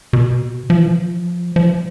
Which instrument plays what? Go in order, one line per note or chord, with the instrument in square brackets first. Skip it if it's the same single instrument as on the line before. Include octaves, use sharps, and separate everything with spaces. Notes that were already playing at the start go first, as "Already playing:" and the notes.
[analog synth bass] B2
F3
E3
F3
F3